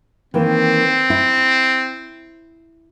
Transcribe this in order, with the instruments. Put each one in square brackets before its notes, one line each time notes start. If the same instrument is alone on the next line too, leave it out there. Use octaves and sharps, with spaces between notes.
[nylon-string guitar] D#3 E3 A#3 [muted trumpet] C4
[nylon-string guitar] E4